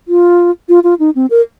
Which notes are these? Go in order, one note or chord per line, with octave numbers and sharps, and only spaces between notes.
F4
F4
F4
D#4
C4
A#4